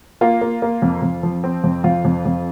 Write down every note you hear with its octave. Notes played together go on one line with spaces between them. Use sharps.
A#3 F4
A#3
A#3
F2
F2
F3
C4
F2
F2 F4
F2
F2